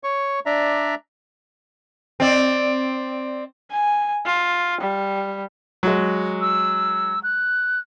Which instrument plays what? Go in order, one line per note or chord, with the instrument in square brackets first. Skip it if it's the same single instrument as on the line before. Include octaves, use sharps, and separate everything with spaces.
[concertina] C#5 C#6
D4 D5 E5 A#5
[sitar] C4 D5
[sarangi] G#5
F4
G3
[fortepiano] F#3 G#3
[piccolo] E6
F#6